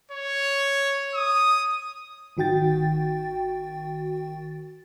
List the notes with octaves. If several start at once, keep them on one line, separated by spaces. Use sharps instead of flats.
C#5
D#6
G#1 D#3 F#4 G5 A6